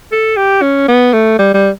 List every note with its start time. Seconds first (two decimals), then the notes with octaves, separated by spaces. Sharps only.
0.12 A4
0.36 G4
0.62 C#4
0.88 B3
1.13 A3
1.38 G3
1.54 G3